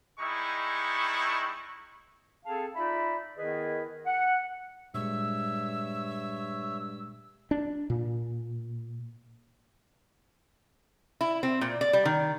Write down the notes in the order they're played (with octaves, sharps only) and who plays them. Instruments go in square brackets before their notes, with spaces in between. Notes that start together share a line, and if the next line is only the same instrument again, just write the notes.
[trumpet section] G3 G#3 D#4 E4 C#6
[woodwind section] C4 G#4 A4 F5 G5 A5
D#4 F4 D5 E5 B5
D#3 B3 E4 G#4 B4 D#5
F#5
[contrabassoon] G2 [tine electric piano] A#2 G#3 [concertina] C#5 E5 [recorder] E6
[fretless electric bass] D4
A#2
[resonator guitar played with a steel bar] E4
C4
A#2
D5
G3
D#3